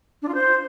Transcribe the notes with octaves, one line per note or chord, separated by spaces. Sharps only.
D4
F4
C5